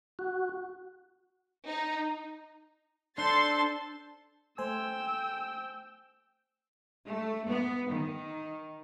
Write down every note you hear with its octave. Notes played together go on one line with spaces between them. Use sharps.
F#4
D#4
D4 A4 C5 A5 C6 A6
A3 C5 G5 G#5 E6
A3
B3
D#3